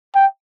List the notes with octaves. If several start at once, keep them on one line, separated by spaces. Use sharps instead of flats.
G5